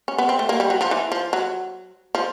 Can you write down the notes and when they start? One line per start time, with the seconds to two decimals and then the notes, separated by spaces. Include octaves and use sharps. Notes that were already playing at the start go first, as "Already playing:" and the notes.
0.08 C#4
0.18 B3
0.29 C4
0.39 A3
0.49 A#3
0.60 G3
0.70 F#3
0.81 F3
0.91 E3
1.12 F3
1.33 F#3
2.15 F3